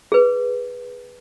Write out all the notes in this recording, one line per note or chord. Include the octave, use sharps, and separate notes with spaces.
G#4 B4